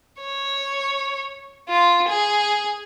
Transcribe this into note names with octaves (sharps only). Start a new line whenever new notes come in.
C#5
F4
G#4